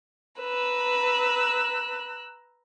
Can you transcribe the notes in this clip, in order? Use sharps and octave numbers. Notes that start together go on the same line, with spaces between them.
B4 A#5 E6 F#6